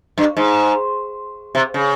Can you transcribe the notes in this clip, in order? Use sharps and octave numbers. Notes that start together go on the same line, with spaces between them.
G2
G#2
C3
C#3